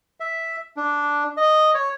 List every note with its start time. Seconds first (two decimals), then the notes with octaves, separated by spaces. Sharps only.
0.20 E5
0.77 D4
1.37 D#5
1.74 C#5